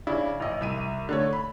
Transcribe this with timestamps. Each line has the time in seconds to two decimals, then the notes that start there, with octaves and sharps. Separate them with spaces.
0.07 C#3 D4 E4
0.40 A1 D#5
0.61 C2 E5 D#7
1.09 D3 A3 C#5
1.33 B5